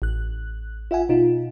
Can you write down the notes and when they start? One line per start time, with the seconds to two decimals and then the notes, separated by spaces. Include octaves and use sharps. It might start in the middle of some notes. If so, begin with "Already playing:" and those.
0.02 A1 F#6
0.91 F4 E5 F#5 G#5
1.09 B2 D#4 F4